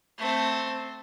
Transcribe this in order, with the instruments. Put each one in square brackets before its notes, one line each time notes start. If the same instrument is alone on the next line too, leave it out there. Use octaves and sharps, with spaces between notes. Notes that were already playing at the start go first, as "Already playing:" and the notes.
[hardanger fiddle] A3 C4